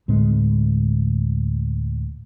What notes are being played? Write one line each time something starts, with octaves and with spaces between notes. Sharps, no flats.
D2 A2 G#3 C4